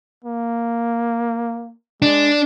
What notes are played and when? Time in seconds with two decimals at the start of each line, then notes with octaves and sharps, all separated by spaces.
0.24 A#3
2.02 G#3 D4